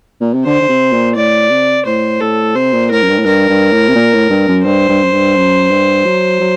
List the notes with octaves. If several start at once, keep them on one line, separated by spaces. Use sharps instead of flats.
A#2
C3
D3 C5
D3
C3
A#2
A2 D5
C3
A2 C5
A2 A4
C3 C5
A#2
A2 A#4
F#2
G2
A2
G2 A#4
G2
A2
C3
A#2
A2
G2
F#2
G2 C5
G2
F#2
G2
F#2
G2
F#3
F#3